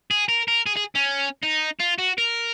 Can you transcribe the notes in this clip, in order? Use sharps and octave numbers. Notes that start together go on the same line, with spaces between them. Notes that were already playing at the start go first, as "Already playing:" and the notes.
G#4
A#4
A#4
G#4
G#4
C#4
D#4
F4
F#4
A#4